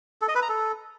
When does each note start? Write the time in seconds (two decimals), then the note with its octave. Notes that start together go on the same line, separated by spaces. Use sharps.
0.22 A4
0.28 D#5
0.35 B4
0.42 A#5
0.49 A4